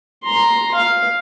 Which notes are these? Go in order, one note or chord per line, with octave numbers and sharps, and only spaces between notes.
A#5 C6
F5